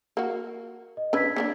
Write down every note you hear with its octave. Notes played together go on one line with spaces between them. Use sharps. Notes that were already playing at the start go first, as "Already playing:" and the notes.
A#3 F#4
D#5
C#4 D4 B4 E6 G#6 B6
A#3 C#4 D4